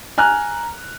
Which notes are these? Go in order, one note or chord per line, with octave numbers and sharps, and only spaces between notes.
G#5 A#5 F6 F#6